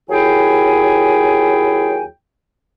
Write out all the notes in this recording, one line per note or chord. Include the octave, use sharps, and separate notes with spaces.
D#2 F#3 E4 G#4 G5 G#5